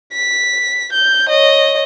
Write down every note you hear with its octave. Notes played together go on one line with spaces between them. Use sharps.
B6
G6
C#5 D#5